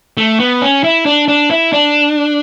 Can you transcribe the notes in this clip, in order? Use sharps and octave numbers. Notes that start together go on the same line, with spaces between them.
A3
B3
C#4
E4
D4
D4
E4
D4